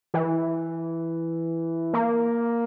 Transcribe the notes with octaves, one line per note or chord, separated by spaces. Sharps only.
E3
A#3